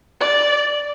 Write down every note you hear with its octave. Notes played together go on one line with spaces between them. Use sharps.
D5